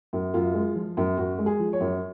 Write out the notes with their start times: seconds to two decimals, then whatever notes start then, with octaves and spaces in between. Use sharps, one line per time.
0.13 F#2
0.34 F#2 F4
0.54 G#3
0.75 F3
0.97 F#2
1.17 F#2 F#4
1.38 G#3
1.46 G#4
1.59 F3
1.73 C#5
1.80 F#2